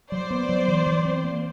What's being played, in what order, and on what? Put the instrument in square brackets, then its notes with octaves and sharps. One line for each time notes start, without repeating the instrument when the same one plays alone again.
[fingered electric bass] F#3 [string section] C5 D5
[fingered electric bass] B3
F#3
E3
E3
C4
A#3